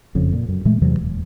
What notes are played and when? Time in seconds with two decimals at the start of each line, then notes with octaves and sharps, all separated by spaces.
0.15 F#1 F2 C#3
0.33 A#2
0.49 F#2
0.65 A#2 E3 G#3 A3
0.81 E2 C3 E3 F#3
0.99 D#1